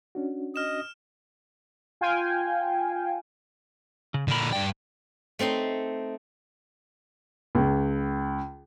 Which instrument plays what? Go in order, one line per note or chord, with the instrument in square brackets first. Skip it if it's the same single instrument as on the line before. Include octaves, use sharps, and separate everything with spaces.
[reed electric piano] C#4 D4 F#4
[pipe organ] D#5 [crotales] F6 E7
[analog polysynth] F4 F5 G5 G#5
[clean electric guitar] C#3
[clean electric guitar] A#2 B5 [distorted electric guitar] D3 A#4
[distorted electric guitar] G2 G5 [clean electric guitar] D5
[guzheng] A3 C4 D#4 C6
[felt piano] C#2